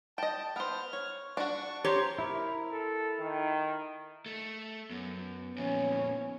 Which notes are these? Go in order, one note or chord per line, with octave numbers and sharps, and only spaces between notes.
D#5 G5 A5
B3 C5 F6
C#5
D4 F#4 A5 C#6
G4 C5 C#5 A#5 C6
E4 A#4
A4
D#3
A3
F#2 B3
F2 A#2 C#4 C#5